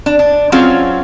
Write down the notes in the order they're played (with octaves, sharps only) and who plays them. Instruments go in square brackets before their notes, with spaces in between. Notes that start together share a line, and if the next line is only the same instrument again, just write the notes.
[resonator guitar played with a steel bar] D4
D4
F#3 C4 C#4 F4 G#4